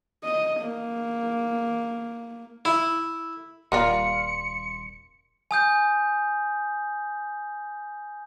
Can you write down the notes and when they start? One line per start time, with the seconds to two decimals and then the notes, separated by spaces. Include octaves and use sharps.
0.24 D#5
0.61 A#3
2.65 E4
3.72 D#1 G3 A#3 F4 C6 C#7
5.51 G#5 D#6 G6